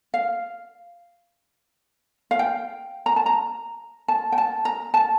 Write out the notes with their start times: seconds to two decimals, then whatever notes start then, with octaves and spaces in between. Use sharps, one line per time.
0.14 F5
2.31 F5
2.39 G5
3.06 A#5
3.16 A5
3.26 A#5
4.08 A5
4.32 G5
4.38 A5
4.65 A#5
4.94 A5